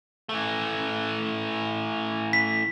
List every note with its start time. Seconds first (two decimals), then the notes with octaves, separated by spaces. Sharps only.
0.29 E3 A3
2.33 B6